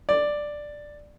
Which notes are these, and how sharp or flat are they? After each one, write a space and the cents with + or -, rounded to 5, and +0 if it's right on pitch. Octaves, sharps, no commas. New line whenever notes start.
D5 +5